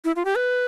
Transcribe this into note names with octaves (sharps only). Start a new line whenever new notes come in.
E4
F4
G4
B4